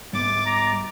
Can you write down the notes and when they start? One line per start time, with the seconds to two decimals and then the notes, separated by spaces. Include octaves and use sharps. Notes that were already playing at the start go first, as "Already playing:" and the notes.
0.13 G#2 G3 B3 D6 A6
0.46 A#5